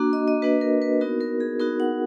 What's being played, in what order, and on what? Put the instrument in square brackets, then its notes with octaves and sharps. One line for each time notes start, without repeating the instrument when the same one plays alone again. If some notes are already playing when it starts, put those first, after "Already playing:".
Already playing: [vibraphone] A#3 D4 F#4
D#5
D#5
A#3 D4 F#4 B4
A#4
B4
B3 D#4 F#4 A#4
A#4
G#4
B3 D#4 F#4 A#4
F#5